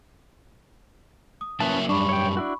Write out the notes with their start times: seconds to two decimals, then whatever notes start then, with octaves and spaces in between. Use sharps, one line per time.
1.41 D#6
1.60 F#3 A#3 C#4 E4 B4 A5
1.89 F#2 G3 D4 B5 C#6
2.09 C#5 G5
2.37 D4 E4 F#4